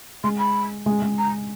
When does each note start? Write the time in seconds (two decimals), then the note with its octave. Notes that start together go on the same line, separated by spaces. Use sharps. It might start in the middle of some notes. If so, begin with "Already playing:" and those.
0.24 G#3 C6
0.38 B5
0.86 G#3
1.02 G#3
1.18 A#5